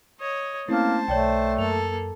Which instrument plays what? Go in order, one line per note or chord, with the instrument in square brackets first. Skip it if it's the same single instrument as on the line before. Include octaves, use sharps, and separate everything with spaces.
[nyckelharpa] C#5 D#5
[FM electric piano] A3 C4 C#4 [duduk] A#3 [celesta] E4 [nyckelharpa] C5 A5
[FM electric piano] B1 [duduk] A3 [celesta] C#5 D5 G5
[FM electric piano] F#2 [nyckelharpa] A#3 A4 [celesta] F7